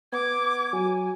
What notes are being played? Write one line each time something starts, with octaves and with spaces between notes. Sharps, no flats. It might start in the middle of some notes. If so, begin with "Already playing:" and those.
B3 D6 G#6
F#3 G#5